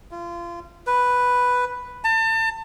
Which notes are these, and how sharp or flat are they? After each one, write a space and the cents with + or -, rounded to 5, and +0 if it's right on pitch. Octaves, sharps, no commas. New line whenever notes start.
F4 -30
B4 +0
A5 +35